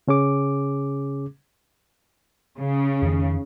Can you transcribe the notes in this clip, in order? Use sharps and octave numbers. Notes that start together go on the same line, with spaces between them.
C#3 C#4 G#4 D6
C#3
F2 D#3